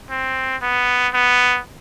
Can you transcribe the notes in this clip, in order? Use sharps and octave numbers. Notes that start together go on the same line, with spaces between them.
C4
B3
B3